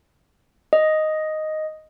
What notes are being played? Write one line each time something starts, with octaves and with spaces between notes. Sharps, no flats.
D#5